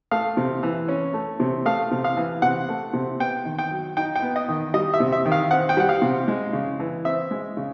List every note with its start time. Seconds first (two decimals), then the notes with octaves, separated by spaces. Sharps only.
0.11 A3 F5
0.37 C3
0.63 E3
0.88 C#4
1.14 A3
1.40 C3
1.65 A3 F5
1.91 C3
2.04 F5
2.17 E3
2.42 C3 F#5
2.69 A3
2.93 C3
3.20 B3 G5
3.45 D#3
3.59 G5
3.71 F#3
3.97 D#4 G5
4.16 G5
4.22 B3
4.36 D#5
4.48 D#3
4.74 G3 D#5
4.94 E5
5.00 C3
5.12 E5
5.25 D#3
5.32 F5
5.51 C4 F#5
5.69 G5
5.77 G3 F#5
5.89 F5
6.02 C3
6.28 G#3
6.53 C#3
6.80 E3
7.05 C4 E5
7.31 G#3
7.57 C#3